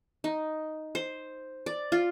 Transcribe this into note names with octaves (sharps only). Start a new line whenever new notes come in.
D#4
C5
D5
F4